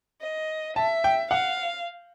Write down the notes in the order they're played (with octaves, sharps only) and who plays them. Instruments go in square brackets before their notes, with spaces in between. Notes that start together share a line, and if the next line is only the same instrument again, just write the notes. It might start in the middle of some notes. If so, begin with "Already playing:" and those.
[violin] D#5
[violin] E5 [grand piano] A5
[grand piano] G5
[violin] F5 [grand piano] F#5